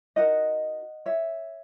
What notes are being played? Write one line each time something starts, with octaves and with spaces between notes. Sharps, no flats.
D#4 F#4 A#4 D#5 F#5
C#5 E5